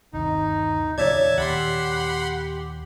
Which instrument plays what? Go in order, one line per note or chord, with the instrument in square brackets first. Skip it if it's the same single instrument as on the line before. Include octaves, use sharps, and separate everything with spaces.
[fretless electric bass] G1 D#2 C3 [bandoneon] D#4
[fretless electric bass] E2 A#2 C#3 [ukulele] C#5 D5 [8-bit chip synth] E5 A5 G#6
[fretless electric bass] D#2 A#2 [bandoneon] G4 [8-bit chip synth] F#5 B5 C6